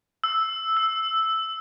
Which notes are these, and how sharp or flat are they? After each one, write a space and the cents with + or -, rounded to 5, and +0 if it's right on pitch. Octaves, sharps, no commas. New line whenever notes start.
E6 -5
E6 +0